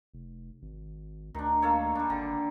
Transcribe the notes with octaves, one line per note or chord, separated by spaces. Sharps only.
F1
G#1
D2 D#3 D4
A#3 A4 C#5
G3 D4
G#1 D3